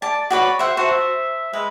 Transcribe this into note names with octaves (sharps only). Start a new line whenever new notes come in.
D5 A5
F#4 B4 C#5 D5
C5 E5 F#5
F#4 C5 A5
E5
G#3 B4